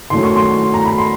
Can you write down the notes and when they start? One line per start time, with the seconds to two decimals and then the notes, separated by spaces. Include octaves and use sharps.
0.10 D#3 F#3 A3 C#4 C6
0.23 C#6
0.36 C6
0.74 A#5
0.85 B5
0.98 C6